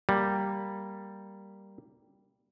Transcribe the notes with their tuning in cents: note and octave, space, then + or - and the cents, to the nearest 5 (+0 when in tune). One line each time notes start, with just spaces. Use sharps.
G3 +0 A#3 +0